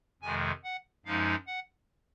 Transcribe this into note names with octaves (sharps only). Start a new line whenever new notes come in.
F2 C3 D#3 G#3 G#5
F#5
F#2 F3 G#3 D#4 F5
F#5